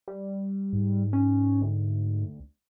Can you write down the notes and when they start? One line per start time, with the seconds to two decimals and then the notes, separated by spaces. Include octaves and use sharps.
0.08 G3
0.73 G#2
1.13 C#4
1.62 D2